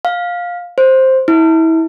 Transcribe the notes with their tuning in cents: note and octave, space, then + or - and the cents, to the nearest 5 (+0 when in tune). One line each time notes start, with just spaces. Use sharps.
F5 +10
C5 +5
E4 -30